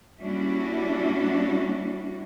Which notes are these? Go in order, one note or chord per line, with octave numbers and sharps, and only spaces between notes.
G3 A#3 C#4 D4 E4 F#4